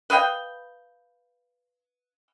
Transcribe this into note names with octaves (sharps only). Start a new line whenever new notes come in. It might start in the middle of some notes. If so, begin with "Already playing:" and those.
B4 D#5 F5 G5